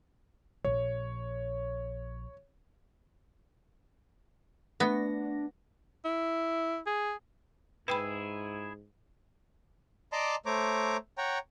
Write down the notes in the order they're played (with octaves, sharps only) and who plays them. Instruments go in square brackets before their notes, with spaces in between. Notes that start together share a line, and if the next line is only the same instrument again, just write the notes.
[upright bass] A#1 [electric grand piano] C#5
[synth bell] A3 F#5 A#6 [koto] B3 [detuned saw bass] D4
[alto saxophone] E4
G#4
[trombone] G#2 [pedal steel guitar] E4 G#4 E6 [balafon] B4 G5 B5
[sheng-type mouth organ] D5 D#5 A5 A#5 C6 D6
A3 C5 C#5 A#5 D6
C#5 F#5 G5 A#5